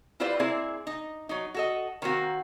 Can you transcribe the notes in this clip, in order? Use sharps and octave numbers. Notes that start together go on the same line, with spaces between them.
E4 F4 G4 B4 C5 D5
A#3 C4 E4 G#4 D5
D#4
F#3 D#4
F#4 A4 D#5
D#3 A#3 C4 F#4